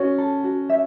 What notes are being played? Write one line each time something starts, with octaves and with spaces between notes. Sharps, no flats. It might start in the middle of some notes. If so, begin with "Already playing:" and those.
Already playing: C#4 F#4
A4
F#4
E5